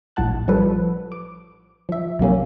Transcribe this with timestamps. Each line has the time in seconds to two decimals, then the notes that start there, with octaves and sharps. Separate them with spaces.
0.16 A#1 A2 F#5 A5 F#6
0.48 F3 G3 A4 B4
1.12 D6
1.89 F3 E5
2.19 B1 C3 A#3 C#4